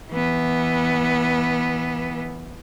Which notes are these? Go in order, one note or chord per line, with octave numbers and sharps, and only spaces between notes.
E3 B3